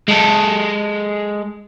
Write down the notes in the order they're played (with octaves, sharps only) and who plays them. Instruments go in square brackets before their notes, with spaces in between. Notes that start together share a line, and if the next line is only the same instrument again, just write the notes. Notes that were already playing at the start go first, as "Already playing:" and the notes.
[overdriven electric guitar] G#3 A4